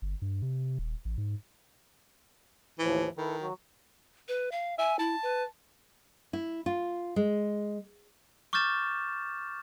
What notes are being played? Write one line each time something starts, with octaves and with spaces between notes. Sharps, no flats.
G1
G2
C3
D#1
A1
G#2
D#2 A2 E3 F3
D#3 E4 A4 B4
F#3 F#4
B4
F5
E5 G#5
E4 A5
B4
E4
F4
G#3
C#6 D6 F6 G6 A6 E7